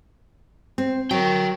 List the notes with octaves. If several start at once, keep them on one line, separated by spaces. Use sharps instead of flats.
C4
F#3 A#4 G5